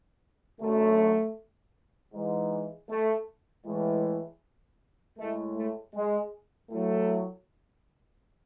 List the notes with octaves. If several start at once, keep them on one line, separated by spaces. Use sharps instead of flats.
F#2 D3 F#3 A3
G#2 E3 G#3
A3
A2 E3 G#3
A2 G#3 A3
A3
G#3
A2 F#3 A3